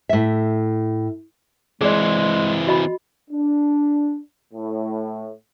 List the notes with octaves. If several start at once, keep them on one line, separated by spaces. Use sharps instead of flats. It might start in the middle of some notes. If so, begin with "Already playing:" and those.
A2 E5
E3 G#3 C4 G#4 D5
F#4 D#5 B5
D4
A2